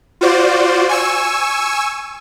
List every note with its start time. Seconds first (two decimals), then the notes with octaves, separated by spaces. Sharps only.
0.21 F4 F#4 C5 D5
0.89 G#5 C#6 E6